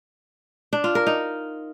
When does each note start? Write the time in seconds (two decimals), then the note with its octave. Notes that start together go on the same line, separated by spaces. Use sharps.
0.73 D4
0.84 F4
0.95 A#4
1.07 D#4